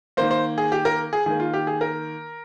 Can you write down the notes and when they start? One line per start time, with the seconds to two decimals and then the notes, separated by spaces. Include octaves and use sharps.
0.17 D#3 A#3 C5
0.31 C5
0.58 G#4
0.72 G4
0.85 A#4
1.13 G#4
1.26 D#3 A#3 G#4
1.40 F4
1.54 G4
1.67 G#4
1.81 A#4